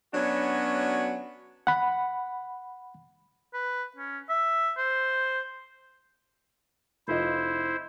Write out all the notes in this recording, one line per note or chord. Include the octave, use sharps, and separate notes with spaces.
F#3 B3 C#4 D4 F#4
F#5 B5
B4
C#4
E5
C5
F1 E4 F4 C5 D#5